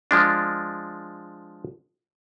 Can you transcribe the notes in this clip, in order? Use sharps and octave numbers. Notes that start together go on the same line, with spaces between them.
F3 G#3 D4